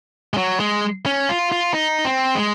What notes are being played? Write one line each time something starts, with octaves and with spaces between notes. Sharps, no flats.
G#3
F#3
G#3
C#4
F4
F4
D#4
C4
G#3